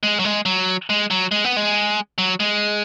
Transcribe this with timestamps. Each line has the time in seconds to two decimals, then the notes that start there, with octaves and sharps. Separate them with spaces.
0.03 G#3
0.19 F#3
0.25 G#3
0.46 F#3
0.90 G#3
1.11 F#3
1.32 G#3
1.44 B3
1.57 G#3
2.18 F#3
2.40 G#3